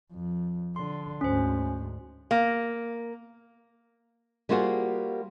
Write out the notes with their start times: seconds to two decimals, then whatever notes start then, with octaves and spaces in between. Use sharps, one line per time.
0.11 F2
0.76 D3 C6
1.21 D2 G#2 C#4 C5
2.31 A#3
4.49 G3 A#3 F4 F#4 G#4 C5